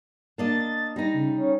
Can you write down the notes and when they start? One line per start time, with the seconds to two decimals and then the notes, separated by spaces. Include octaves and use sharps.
0.38 A#3 D4 D#5 A6
0.96 G3 D#4 A#6
1.14 C#3
1.37 C#4